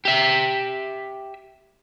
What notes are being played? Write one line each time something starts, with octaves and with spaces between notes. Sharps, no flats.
G4 E5